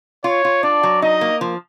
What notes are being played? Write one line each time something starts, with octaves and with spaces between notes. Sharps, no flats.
F4 C#5
F4
D4 D5
F#3
D#4 D#5
A#3
F3